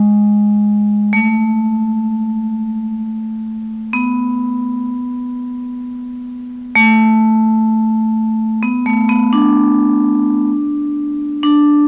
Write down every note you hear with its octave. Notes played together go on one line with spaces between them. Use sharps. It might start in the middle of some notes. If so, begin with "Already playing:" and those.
Already playing: G#3
A3
B3
A3
B3
A3
B3
D4
D4